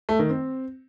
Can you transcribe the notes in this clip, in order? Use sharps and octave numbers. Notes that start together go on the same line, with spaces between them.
A3
D#3
C4